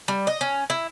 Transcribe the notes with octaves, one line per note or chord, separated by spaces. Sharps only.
G3
D#5
C#4
E4